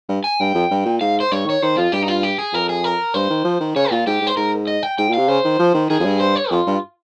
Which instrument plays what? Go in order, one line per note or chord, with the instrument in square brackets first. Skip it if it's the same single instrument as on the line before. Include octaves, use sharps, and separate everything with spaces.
[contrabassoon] G2
[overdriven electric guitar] G#5
[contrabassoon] G2 [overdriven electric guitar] G5
[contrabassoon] F2
G2
A#2
[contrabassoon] G#2 [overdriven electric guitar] F5
[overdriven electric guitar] C5
[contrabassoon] G2 [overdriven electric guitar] C#5
[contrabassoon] D#3 [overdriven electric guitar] C#5
[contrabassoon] D#3 [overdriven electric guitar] C5
[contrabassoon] F2 [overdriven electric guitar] F4
[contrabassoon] G2 [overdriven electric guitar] G4
[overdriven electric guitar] D#4
F4
G4
G#4
[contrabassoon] F2 [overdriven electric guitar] A#4
[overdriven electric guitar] G#4
A#4
[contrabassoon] G2 [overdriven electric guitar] C5
[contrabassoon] D#3
F3
D#3
[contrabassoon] C#3 [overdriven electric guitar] C#5
[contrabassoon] A#2 [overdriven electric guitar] F4
[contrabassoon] G#2 [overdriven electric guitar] G4
[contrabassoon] G#2
[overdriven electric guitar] C5
[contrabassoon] G#2 [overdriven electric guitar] A#4
[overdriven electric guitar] D#5
G5
[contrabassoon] G#2 [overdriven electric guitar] G5
[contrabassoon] A#2
[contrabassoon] C3 [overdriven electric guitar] F5
[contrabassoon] C#3 [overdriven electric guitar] C5
[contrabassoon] D#3
F3
D#3
[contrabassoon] D#3 [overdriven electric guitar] G#4
[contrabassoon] F2
G2
[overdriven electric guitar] C5
C#5
[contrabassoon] F2 [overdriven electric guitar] F4
[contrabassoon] G2